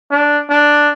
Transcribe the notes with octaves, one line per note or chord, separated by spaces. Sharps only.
D4
D4